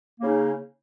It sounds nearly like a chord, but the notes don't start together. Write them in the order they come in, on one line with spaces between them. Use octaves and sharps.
A#3 C#3 D#4